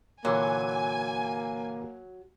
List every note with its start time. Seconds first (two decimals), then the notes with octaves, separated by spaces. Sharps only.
0.25 A#2 D3 E3 F#3 A#3 G#5